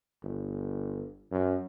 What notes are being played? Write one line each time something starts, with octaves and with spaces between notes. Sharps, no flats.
G1
F#2